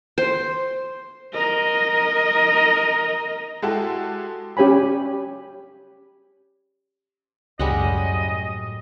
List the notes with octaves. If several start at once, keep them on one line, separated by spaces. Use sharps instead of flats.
C5
A#4 D#5
G#3 E4 F#4 G4 A4
C#4 G4 C#5 G#5 B5
C#2 F#2 A2 G3 G#3 D#5 F#5